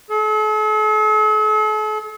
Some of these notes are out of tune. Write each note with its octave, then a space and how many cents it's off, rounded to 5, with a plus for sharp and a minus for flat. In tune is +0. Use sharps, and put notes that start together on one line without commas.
A4 -45